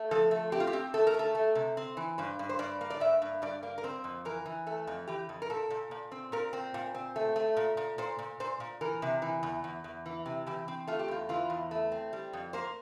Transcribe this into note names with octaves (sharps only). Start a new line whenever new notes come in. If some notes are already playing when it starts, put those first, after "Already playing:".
Already playing: A3
F3 A4
A3
C4 G4
F4
G4
C4
A3 A4
A#4
A3 A4
A3
C3
C4
E3
G2 C5
G2
C5
G2 D5
A#3
D5
G2 E5
G2
G2 D5
A#3
A#4
C4 C5
F2
E3 A#4
E3
A3 A4
F2
E3 G4
F2
A#4
A#2 A4
A#2
A#2
C4
A#2 A#4
C4
A#2
C4
A3
A3
A#2
A#2
A#2 C5
A#2
A#2 C5
A#2
E3 A#4
C3
E3
E2
E2
E2
E3
C3
E3 G4
C4
A3 F4
G4
E2 F4
E3 F4
E2
A3
C4
G3
F2
A#3 C5